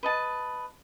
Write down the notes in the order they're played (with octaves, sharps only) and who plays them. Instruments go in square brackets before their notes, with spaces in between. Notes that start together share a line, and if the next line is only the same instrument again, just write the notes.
[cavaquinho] B4 D#5 A5